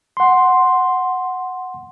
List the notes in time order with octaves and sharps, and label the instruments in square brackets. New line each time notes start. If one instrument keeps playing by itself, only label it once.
[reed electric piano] F#5 C6